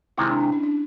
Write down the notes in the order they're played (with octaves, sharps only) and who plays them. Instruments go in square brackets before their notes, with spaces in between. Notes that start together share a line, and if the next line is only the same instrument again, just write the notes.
[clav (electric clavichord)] C3 D#3 G#3 C4 F4 [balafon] E4
[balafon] D4
D4
C#4
D4